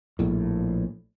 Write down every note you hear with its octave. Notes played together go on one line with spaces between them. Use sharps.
A#1 A2